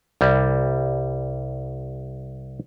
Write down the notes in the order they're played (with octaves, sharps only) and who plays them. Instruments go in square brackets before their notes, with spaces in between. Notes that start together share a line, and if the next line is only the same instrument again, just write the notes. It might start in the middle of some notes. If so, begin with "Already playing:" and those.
[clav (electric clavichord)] C2 G3